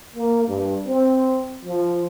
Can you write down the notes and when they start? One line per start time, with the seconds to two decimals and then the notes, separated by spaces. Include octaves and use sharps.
0.16 A#3
0.48 G2
0.87 C4
1.64 F3